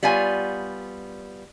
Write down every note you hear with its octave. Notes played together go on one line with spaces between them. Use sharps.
G3 B3 F4 C#5 G#5